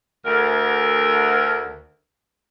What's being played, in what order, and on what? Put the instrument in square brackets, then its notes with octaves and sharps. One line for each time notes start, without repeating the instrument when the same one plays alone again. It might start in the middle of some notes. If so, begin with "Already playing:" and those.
[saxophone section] D2 A#4